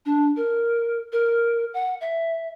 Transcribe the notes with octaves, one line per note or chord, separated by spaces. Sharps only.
D4
A#4
A#4
F#5
E5